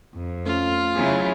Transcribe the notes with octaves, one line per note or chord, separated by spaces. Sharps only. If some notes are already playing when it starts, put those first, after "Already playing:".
F2
A3 C#4 F4
C#3 F#3 E4 G#4